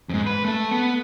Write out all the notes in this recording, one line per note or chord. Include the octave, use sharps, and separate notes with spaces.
F2 G#2
B4
A3 A4
B3